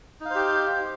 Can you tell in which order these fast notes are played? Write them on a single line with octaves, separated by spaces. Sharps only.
D#4 F5 C5 G4